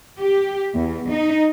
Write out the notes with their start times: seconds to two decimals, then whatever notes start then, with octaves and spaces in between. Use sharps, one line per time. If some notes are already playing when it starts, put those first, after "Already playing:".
0.20 G4
0.77 E2
1.11 D#4